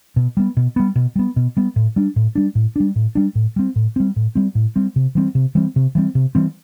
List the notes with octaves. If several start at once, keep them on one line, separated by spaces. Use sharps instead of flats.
B2
G3 B3
B2
G3 B3
B2
G3 B3
B2
G3 B3
A2
G3 D4
A2
G3 D4
A2
G3 D4
A2
G3 D4
A2
G3 C4
A2
G3 C4
A2
G3 C4
A2
G3 C4
C3
E3 G3 C4
C3
E3 G3 C4
C3
E3 G3 C4
C3
E3 G3 C4